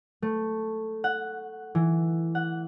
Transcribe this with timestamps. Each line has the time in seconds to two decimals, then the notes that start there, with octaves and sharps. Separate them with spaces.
0.22 A3
1.04 F#5
1.75 E3
2.35 F#5